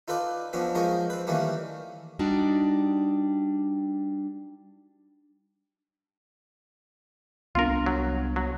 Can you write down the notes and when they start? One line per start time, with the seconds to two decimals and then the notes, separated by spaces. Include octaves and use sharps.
0.08 D#4 F4 A4 B4 D5
0.53 F2 F3 B3 C#4 D4
0.75 F3 G#3 D#4 A#4 C#5 D#5
1.10 C4 B4
1.27 D#3 E3 G3 A3 A#3 C#4
2.19 G3 D4 D#4 F#4
7.55 C2 B3 D4 F4 A#4
7.86 F#3
8.36 F#3